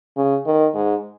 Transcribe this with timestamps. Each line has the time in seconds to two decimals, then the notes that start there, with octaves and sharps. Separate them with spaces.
0.17 C#3
0.46 D#3
0.74 G#2